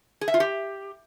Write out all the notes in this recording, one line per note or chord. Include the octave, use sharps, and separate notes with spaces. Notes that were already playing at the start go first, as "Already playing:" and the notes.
G#4
E5
F4
G4